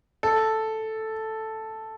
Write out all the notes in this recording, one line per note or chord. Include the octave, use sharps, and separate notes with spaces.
A4